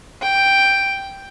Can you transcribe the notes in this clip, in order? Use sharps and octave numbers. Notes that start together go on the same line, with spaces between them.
G5